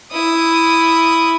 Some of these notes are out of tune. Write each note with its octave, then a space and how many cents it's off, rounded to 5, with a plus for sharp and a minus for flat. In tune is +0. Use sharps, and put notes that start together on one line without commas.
E4 +0 D#6 +0